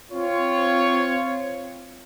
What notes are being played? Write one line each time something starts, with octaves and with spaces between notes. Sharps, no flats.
C4 F4 C#5